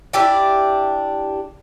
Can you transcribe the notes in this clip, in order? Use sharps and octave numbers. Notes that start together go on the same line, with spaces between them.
D4 E4 G4 D5